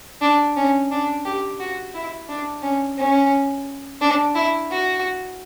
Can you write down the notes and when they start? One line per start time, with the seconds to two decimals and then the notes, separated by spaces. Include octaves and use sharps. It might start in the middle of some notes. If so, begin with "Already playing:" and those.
0.22 D4
0.56 C#4
0.91 D4
1.25 G4
1.60 F#4
1.94 E4
2.29 D4
2.63 C#4
2.98 C#4
4.01 D4
4.35 E4
4.71 F#4